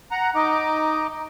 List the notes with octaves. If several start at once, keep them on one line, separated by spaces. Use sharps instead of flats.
F#5 A#5
D#4 D#5 D6